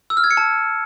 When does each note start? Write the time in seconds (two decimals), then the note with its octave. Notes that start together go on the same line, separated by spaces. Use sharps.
0.10 E6
0.17 F6
0.24 G#6
0.31 C#7
0.37 A5